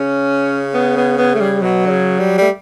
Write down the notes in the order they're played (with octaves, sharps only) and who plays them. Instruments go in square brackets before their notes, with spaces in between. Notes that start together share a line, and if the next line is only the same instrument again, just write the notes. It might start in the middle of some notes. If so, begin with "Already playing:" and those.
Already playing: [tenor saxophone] C#3 [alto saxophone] C#4
[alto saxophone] B3
B3
B3
A3
G3
[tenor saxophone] B2 [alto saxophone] F#3
[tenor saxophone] D3
C#3
G3
[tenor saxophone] G3 [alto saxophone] A3